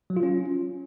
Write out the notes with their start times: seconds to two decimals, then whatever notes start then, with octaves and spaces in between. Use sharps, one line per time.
0.10 F#3
0.17 F4
0.23 C#4